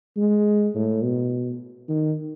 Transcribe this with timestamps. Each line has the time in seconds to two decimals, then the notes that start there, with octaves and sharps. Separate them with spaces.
0.17 G#3
0.75 A2
1.04 B2
1.89 D#3